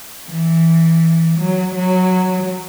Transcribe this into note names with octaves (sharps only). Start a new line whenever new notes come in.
E3
F#3
F#3